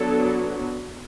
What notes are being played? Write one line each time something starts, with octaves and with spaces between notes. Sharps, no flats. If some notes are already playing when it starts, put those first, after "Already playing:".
Already playing: F#3 B3 D4 A4